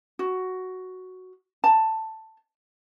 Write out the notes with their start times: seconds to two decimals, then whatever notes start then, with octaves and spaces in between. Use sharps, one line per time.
0.19 F#4
1.64 A5